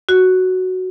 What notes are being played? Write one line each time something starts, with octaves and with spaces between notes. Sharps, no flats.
F#4